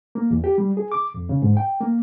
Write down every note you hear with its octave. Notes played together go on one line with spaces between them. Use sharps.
A#3
E2
G4
G3
G#4
D6
F2
C#3
G#2
G5
A#3